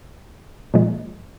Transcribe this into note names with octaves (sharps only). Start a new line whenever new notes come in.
A#2 F3 G#3